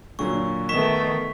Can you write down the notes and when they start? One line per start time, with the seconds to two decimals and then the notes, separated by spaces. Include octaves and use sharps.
0.19 A#2 D3 F#3 C#6
0.69 D#3 A3 B3 C#6 B6 E7